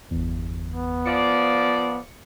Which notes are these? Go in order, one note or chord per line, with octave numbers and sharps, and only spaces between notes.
G1 E2
B3
F3 D5 C#7